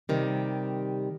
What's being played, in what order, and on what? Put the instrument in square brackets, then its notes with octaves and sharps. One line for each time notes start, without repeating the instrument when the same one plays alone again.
[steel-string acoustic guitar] C3 D#3 G3